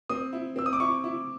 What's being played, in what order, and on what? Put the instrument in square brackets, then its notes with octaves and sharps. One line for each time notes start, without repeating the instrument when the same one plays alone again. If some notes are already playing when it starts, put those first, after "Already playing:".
[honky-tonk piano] C4 [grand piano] D#6
[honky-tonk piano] E4
[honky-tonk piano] C4 [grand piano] E6
[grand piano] D#6
D6
[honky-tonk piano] E4 [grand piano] C#6
[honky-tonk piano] E4